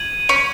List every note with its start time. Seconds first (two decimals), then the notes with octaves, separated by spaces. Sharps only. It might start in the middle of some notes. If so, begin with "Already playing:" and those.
Already playing: G#6 D#7 F#7
0.29 C#4